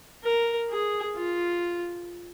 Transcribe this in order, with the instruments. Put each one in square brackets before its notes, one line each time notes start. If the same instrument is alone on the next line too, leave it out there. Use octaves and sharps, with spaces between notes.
[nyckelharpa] A#4
G#4
F4